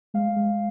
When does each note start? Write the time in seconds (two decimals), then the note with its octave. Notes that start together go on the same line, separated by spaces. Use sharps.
0.14 G#3 F5
0.36 G#3